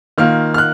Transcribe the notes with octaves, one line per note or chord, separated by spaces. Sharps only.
D#3 A#3 F4 F6
F6
F#6